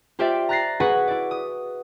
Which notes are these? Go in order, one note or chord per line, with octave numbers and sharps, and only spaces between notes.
F4 G4 C5 D5 E5 G5
A#5 F#6 A6 A#6 C7
F#4 G#4 B4 F#5
E4 D5
D#6